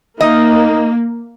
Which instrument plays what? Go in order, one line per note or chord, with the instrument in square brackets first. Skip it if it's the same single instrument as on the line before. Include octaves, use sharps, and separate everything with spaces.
[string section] A#3 [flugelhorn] D#4 [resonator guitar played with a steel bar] D#5